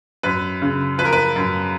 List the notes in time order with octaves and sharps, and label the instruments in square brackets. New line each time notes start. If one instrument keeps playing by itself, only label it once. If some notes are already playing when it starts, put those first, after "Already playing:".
[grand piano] F#2 B4
C#3
F3 B4
A#4
B4
F#2